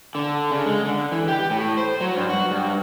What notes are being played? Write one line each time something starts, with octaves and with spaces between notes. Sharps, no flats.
D3
C#3
G#3
D3
E3
G4
A2
C5
F#3
G2
F#4
G2